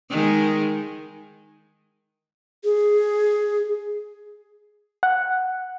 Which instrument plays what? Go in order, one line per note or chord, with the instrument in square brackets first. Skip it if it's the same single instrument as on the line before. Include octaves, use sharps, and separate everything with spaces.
[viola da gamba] D#3 G#3
[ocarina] G#4
[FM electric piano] F#5